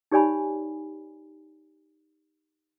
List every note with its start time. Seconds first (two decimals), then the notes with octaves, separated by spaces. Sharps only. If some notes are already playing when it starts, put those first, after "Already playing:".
0.11 D#4 G4 C#5 D5 G#5 B5